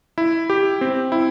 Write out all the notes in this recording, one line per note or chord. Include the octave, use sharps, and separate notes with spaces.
E4
G4
C4
E4